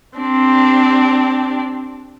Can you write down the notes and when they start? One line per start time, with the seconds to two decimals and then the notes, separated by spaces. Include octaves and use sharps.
0.18 C4 D4 G4